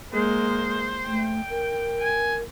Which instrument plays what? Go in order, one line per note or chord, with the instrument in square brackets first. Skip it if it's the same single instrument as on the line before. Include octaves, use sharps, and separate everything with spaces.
[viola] G#3 A#3 [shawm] C5
[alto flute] A3 [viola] G5
[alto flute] A#4
[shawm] G#5